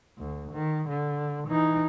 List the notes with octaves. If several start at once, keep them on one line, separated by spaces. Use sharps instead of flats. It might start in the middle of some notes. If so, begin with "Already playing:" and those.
D2
D#3
D3
E3 D#4